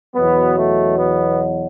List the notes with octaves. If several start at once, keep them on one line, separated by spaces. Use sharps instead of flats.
E2 B2 F#3 B3
A3
B3